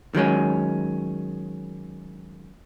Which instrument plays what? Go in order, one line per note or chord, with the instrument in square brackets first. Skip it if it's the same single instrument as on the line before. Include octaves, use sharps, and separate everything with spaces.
[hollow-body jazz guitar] D#3 F#3 G#3 C#4